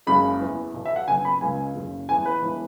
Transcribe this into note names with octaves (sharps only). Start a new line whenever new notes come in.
F#1 F#2 C#3 G#3 B5
E2 E3 B3
B1 B2 B3
E5
F#5
F#1 F#2 F#3 B3 G#5
B5
C#2 C#3 G#3 G#5
F#1 F#2 C#3
E2 E3 B3 G#5
B4
E1 E3